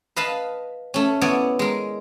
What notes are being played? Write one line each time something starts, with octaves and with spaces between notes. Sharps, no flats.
B4 D#5 F5 A5 B5
A3 C#4
B3 E4 C#5 D5
G#3 A#4